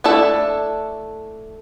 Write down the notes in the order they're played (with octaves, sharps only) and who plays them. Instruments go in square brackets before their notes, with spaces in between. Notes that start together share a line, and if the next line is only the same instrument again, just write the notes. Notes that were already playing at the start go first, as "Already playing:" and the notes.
[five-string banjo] A3 D4 E4 A4